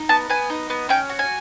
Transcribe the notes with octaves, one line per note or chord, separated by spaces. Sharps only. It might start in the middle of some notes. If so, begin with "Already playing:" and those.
Already playing: D#4
B3 A5
B3 G#5
D#4
B3
C#4 G5
F#4
G#5